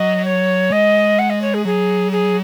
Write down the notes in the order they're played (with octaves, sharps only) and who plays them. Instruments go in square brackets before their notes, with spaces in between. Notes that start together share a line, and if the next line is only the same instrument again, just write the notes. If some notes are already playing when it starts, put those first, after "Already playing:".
Already playing: [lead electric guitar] F#3 [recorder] D#5
[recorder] C#5
[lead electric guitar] G#3 [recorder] D#5
[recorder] F#5
D#5
C#5
G#4
[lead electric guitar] F#3 [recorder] G#4
[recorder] G#4